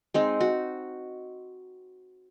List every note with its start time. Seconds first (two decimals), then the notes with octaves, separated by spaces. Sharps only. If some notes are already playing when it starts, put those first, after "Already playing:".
0.14 G#3 C4 D#4
0.41 F#4